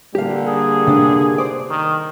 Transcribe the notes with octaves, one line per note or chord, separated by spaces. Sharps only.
D3 G3 A#3 G4 F5
G#4
C3 D4
C5 D5
D#3